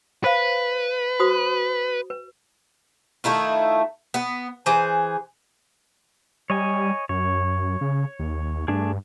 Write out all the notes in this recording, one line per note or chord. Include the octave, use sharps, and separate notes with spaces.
B4 C5 F5
F#4 C5 D#6
B4
D#3 A3 E4 F4
B3
E3 G#4 C5
G3 C#5 D#5 G#5
F#2 C#5
C#3
D#2
G2 A3 D4 G#4